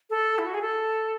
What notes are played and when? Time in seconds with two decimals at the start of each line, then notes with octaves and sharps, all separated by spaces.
0.10 A4
0.39 E4
0.46 F#4
0.54 G#4
0.62 A4